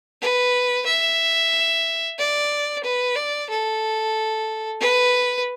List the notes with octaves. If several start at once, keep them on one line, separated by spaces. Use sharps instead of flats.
B4
E5
D5
B4
D5
A4
B4